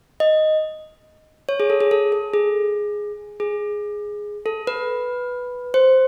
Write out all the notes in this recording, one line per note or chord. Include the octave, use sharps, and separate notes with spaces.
D#5
C#5
G#4
A4
G#4
A4
A4
G#4
G#4
A4
B4
C5